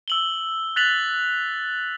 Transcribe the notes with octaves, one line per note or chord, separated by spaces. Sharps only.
E6 F#7 G7
F#6 A6 B6 F7 F#7